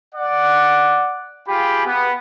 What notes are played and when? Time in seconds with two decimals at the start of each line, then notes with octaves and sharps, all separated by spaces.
0.15 D5 F#5
1.48 F4 G4 G#4 G5 B5
1.86 B3